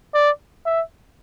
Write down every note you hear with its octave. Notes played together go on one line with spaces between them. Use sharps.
D5
E5